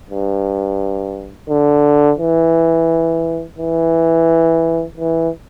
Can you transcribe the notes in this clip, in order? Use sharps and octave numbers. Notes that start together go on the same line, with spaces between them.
G2
D3
E3
E3
E3